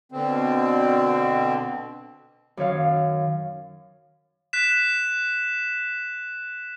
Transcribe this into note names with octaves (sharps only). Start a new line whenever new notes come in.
B2 D3 C4
F#2 D#3 C#5 F5
F#6 B6 E7